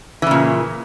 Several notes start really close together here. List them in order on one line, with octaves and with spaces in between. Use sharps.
E3 C#3 A#2